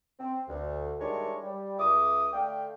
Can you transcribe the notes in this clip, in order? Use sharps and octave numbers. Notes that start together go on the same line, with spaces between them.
C4
D2
D#3 G3 G#3 D4 E4 C#5
G3
C#2 E5 D6 D#6
D3 A3 D5 F5 G5